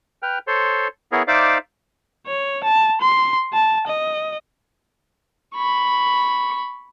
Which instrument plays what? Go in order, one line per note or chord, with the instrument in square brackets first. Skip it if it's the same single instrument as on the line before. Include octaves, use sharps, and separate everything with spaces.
[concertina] B4 G5 F6
A4 C5 C#5 C6
B3 E4 G#4 A#4 C#5
D#4 C5 D5 E5 F5 D6
[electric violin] C#5
A5
C6
A5
D#5
[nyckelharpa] B5 C#6